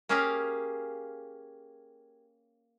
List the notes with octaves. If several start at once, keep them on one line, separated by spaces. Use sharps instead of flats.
A#3 C#4 G4 G#4 A#4 F5